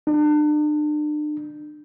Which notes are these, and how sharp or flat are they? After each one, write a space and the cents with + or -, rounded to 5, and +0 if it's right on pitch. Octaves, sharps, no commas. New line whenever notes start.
D4 +40